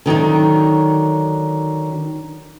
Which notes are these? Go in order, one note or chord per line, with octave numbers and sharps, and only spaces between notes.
D3 D#3 F#3 D#4